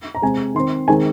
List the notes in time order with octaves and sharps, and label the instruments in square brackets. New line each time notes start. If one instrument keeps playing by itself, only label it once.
[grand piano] A#5
C3 G#3 C4 G#5
D#3 C4 C6
D#3 G#3 C4 G#5